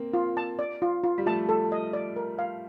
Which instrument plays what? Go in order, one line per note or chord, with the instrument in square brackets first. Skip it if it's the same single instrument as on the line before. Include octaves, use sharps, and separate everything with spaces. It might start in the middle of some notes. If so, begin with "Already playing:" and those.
Already playing: [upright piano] A#3 C4
[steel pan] F4
A5
D5
F4
F4
[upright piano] G3
[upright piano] F3 A3 [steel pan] A5
[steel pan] A4
D#5
D5
A#4
F5